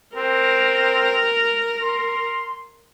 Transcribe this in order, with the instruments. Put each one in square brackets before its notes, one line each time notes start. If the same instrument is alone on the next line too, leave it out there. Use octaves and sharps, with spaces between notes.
[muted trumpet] C4 [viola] A#4
[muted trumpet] C6